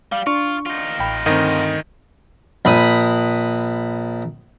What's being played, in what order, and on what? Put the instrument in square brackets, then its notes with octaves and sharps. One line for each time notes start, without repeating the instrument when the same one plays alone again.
[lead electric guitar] G3 [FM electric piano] F5
[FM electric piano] D4 [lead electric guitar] F4 [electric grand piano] C#6
[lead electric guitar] D#4 F4
[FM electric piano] A1 G5 B5
[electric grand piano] D2 D#3 D#5 [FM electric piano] G2 C4
[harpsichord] A#1 B5 D#6